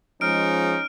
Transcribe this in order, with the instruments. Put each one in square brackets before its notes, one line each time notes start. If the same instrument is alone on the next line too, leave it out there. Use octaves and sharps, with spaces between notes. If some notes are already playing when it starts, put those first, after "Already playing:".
[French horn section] F3 G#3 [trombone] C#4 [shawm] D#4 [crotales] F6 D7